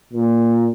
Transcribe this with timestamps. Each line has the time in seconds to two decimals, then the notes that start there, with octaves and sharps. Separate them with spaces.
0.13 A#2